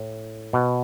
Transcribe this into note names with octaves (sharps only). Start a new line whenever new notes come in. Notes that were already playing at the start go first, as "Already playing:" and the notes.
Already playing: A2
B2